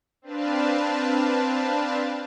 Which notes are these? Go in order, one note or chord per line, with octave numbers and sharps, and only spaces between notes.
C4 D4 B4 F5 A5